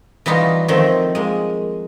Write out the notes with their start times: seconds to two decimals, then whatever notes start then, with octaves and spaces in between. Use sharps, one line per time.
0.26 E3 G3 D#4 F4 F#4
0.68 D#3 F3 A3 C4
1.15 G#3 A#3